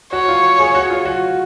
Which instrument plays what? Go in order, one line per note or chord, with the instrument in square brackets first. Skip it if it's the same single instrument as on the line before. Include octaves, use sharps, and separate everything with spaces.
[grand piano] F#4 [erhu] C#5
[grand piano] F4
G#4
F#4
F4
F#4